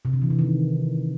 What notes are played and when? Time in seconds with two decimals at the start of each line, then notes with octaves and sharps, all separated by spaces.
0.05 C3
0.13 D3
0.22 E3
0.30 C3
0.39 D#3